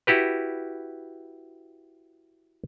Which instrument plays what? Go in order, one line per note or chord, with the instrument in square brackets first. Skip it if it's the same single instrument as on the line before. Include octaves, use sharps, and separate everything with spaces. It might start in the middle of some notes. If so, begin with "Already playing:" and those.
[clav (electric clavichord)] E4 F#4 G4 B4